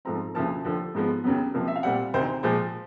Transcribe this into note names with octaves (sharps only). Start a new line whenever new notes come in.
G#2 F3 A3 C4 A#5
D2 C#3 F3 A#3 A5
D#2 D3 F3
G#2 F3 G#3 B3
D#2 C#3 F#3 B3
C#2 C3 F3 A#3
E5
F5
A#2 G3 C4 F#5
D2 C3 D#3 C5
A#2 F3 G#3 C5